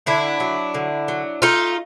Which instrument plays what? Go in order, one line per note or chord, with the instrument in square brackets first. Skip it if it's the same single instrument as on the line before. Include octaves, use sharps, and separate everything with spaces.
[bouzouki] D3 D4 E4
F#3
D3
F#3
A3 D#4 F4